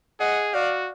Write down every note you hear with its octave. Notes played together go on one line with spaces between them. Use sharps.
G#4 D#5 F#5
F#4 D5 F5